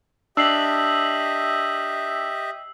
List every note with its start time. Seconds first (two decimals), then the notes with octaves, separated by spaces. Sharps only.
0.37 D4 G4 D#5 E5 E6 C7 F#7